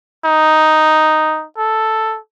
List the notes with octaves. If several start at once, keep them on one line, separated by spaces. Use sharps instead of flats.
D#4
A4